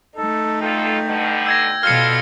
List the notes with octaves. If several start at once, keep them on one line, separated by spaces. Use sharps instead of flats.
A3 D#4 A4
E2 F4 A4 G5
B2 D3
E6 G#6 A#6
B2 G3 F4 A4 F5 F6 C#7